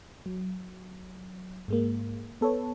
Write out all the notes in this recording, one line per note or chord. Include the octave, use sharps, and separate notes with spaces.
F#3
G#2 G#3 A#3
B3 A4 B4 C#5